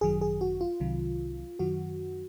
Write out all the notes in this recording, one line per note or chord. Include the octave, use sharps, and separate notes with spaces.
G#1 F#2 D#3 F#3 G#4
G#4
F#4
F4
C2 C3 D#3 F#3
F#2 D#3 F#3 F#4